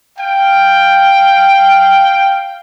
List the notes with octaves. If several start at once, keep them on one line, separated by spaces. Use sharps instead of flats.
F5 G5